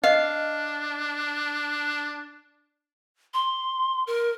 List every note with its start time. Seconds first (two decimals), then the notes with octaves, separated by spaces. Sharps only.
0.04 D4 D#5 F5
3.34 C6
4.07 A#4